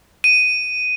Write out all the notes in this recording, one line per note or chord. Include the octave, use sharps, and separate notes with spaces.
D#7